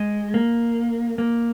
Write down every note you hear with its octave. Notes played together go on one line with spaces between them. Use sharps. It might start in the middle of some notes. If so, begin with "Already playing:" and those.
Already playing: G#3
A#3
A#3